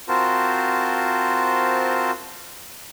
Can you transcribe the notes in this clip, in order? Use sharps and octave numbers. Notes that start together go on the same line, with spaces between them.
C4 F4 F#4 A#4 C5 A5